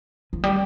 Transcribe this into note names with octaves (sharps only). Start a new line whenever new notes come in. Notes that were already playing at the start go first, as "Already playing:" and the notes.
F3
G3